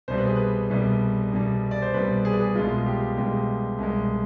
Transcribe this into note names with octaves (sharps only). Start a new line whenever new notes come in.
C2 B2 G3 C5
B4
G#4
B4
C2 B2 G3
C2 B2 G3
D5
C5
C2 B2 G3 B4
G#4
B4
G#4
C2 B2 G#3 F4
G4
C2 B2 G#3 G4
C2 B2 G#3